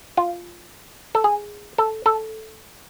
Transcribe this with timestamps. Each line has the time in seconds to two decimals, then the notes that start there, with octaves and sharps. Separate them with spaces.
0.17 F4
1.15 A4
1.24 G#4
1.78 A4
2.06 A4